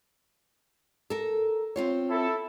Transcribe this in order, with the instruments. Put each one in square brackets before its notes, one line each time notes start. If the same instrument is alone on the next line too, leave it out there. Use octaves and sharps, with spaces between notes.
[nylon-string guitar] A4 A#4
C4 F4 C#5
[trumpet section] E4 A4